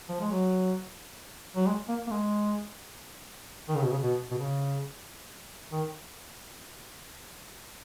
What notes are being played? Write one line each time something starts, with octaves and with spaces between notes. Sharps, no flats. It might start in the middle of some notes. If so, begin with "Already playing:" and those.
F3
G#3
F#3
F#3
G#3
A#3
A#3
G#3
D#3
C#3
B2
C#3
B2
B2
C#3
D#3